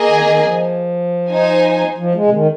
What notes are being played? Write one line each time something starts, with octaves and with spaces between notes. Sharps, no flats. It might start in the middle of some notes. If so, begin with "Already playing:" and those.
Already playing: A#3 G#4 D#5 G#5
D#3
D#3
F3
D#4 C5 G#5
F3
G#3
C3
D#3